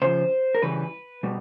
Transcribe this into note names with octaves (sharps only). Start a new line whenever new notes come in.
C#3 F3 C5
A#4
C#3 E3 G3 B4
B2 G3